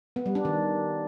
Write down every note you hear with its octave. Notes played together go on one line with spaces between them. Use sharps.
B3
G3
D4
D#3